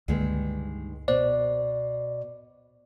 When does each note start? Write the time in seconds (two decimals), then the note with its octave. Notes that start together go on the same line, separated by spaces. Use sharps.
0.08 C#2 G2 D3 D#3 G#3 A#3
1.08 B2 C5 D5